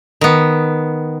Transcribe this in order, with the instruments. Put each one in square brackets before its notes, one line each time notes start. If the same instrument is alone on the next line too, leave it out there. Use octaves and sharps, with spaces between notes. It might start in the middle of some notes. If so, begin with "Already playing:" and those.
[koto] D#3 B3